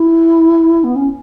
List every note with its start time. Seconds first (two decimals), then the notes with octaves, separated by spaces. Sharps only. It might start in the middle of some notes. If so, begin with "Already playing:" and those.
Already playing: E4
0.84 B3
0.96 C#4